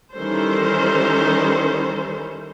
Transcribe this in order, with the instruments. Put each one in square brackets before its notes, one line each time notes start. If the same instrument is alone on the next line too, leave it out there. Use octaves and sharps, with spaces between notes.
[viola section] D#3 E3 G3 C#4 A4 C5